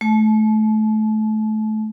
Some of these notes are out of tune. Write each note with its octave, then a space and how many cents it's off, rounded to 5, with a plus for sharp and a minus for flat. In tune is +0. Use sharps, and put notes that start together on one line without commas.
A3 -25 A5 -35